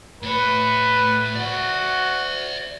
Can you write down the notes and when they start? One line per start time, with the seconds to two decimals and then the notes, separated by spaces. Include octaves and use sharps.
0.22 A2 B4 C#5
1.35 F#4 D5 E5